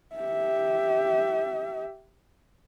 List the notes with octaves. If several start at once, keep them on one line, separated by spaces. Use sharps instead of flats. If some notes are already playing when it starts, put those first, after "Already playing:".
G4 E5